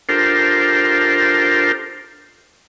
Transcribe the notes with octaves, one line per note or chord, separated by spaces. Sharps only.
D4 F4 G4 A4 A#4 C5